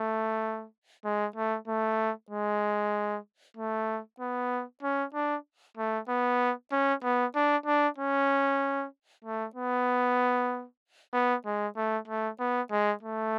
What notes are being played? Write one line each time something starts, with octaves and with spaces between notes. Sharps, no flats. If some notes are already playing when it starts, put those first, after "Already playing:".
Already playing: A3
G#3
A3
A3
G#3
A3
B3
C#4
D4
A3
B3
C#4
B3
D4
D4
C#4
A3
B3
B3
G#3
A3
A3
B3
G#3
A3